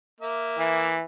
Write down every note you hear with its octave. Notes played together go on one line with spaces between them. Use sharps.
A#3 E5
E3